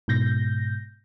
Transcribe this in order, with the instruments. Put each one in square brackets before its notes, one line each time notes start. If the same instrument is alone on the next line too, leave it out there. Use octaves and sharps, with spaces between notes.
[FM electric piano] G#2 B2 G6 A#6